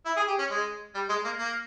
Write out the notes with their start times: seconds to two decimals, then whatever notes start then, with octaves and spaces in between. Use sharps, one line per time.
0.06 E4
0.17 G#4
0.28 G4
0.39 C#4
0.50 G#3
0.95 G3
1.09 G#3
1.25 A#3
1.39 A#3